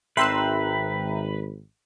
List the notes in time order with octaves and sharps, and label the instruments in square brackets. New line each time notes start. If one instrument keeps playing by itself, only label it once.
[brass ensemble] G#1 [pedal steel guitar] B4 [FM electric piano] E5 G5 A#5 [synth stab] C6 E6 F#6